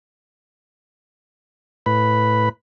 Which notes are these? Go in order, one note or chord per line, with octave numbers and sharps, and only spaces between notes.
A2 B4 B5